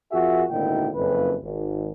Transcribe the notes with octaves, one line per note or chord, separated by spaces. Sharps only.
F2 F4 F#4 G#4 A#4 E5
G#1 D2 A#2 D#4 E4 G5
F#1 F2 B4
G#1